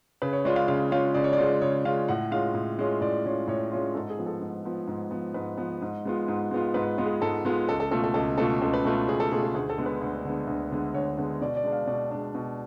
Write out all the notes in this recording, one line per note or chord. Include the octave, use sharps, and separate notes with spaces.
C#3 B4
C#5
G#3 C#4 F4 D5
F5
C#3 F5
G#3 C#4 F4 F5
C#3 D5
C#5
D5
G#3 C#4 F4
C#3 C#5
G#3 C#4 F4 F5
A2 F#5
G#3 C#4 F4 F5
A2
G#3 C#4 F4
A2 D5
G#3 C#4 F4
A2 C#5
G#3 C#4 F4
G#2 A4
G#4
F3 B3
A4
G#2
F3 B3
G#2
F3 B3
G#2 B4
F3 B3
G#2
G#3 B3 F4
G#2
G#3 B3 F4
G#2 B4
G#3 B3 F4
G#4
G#2 A4
G#3 B3 F4
C#2 A4
A4
B2 A3 F4 A4
A4
C#2 A4
B2 A3 F4 A4
C#2 A4
B4
B2 A3 F4 A4
C#2 G#4
A4
B2 A3 F4 G#4
G#4
D2 G#4
A4
D3 G#3 B3
B4
D2
D3 G#3 B3
D2
D3 G#3 B3
D2 C#5
D3 G#3 B3
B2 D5
D5
G#3 D4
F5
B2 D5
G#3 D4
B2